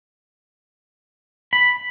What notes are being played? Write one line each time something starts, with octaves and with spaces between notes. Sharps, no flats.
B5